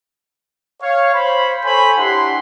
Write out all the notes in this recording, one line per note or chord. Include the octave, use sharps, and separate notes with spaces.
C#5 F5
C5 B5
A4 C5 C#5 G#5 B5
D4 E4 G4 F#5 C6